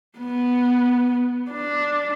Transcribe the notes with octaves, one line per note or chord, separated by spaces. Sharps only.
B3
D4